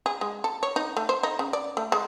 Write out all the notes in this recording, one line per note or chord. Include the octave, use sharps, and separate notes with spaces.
G#4
G#3
A4
C#5
D#4
A3
C5
D#4
C#3
D5
A3
G#3